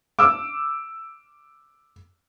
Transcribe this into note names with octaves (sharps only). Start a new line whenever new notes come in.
D6 E6